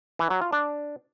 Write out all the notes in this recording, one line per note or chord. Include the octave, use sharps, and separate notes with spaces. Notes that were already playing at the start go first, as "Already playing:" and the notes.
E3
F#3
F4
D4